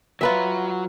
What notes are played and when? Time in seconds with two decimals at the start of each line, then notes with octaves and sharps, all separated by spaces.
0.21 F#3 F4 B4 E5 G#5 A#5